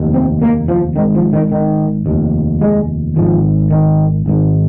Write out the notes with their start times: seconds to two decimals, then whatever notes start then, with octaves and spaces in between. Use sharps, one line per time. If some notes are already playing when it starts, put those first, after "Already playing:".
Already playing: F1 D#2
0.14 C4
0.42 A#3
0.68 F3
0.96 G#1 G#2 D#3
1.15 F3
1.33 D#3
1.52 D#3
2.06 F1 D#2
2.61 G#3
3.16 G#1 G#2 F3
3.71 D#3
4.26 G#1 G#2